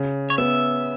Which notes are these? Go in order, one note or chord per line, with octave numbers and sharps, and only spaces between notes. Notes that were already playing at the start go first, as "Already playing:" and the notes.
Already playing: C#3
C#5
B3 E5